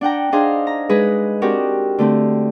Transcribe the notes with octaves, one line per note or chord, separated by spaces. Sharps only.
D4 F#5 G5 A#5
D4 D#4 G#4 C5 F5
A#5
G#3 D#4 G#4 B4
C4 D4 F#4 G4 A#4
D3 A3 C4